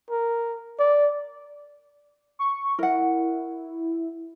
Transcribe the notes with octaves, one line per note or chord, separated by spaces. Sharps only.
A#4
D5
C#6
E4 A#4 F#5